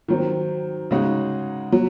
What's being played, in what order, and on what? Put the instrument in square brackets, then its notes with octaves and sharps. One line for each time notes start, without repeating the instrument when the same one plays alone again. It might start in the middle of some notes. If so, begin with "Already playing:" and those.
[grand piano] D#3 F#3 C4
C#3 G#3 D#4 F#4
F#3